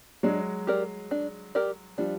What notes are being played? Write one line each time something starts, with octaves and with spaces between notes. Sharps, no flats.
F#3 G#3 D4
G4 A#4 D5
D4
G4 A#4 D5
F3 G3 D4